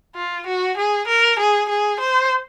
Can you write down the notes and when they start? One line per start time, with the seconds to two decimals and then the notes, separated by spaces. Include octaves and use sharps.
0.15 F4
0.46 F#4
0.77 G#4
1.07 A#4
1.39 G#4
1.69 G#4
2.00 C5